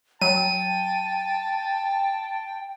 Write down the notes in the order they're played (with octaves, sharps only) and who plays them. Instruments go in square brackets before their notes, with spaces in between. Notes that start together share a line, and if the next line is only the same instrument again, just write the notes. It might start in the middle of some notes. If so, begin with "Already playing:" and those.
[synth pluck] F#3 [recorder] G5 [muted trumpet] A5 [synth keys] D#7